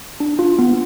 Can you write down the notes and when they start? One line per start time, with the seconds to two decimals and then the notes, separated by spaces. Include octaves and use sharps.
0.20 D4
0.39 F4
0.59 B3